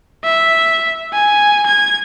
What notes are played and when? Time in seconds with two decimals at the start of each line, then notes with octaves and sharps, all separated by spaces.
0.24 E5
1.12 G#5
1.66 G#6